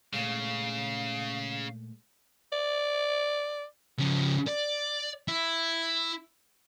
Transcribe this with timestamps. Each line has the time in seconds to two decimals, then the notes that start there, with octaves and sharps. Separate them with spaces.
0.13 A#2 C#3 G#3 A3 F5
2.52 D5
3.98 C#3 F3
4.48 D5
5.28 E4